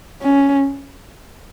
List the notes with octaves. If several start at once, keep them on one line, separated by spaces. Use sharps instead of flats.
C#4